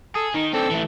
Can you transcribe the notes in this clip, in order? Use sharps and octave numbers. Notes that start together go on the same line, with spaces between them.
G#4 A4
D#3 D#4
C4 D4 A4
E3 A3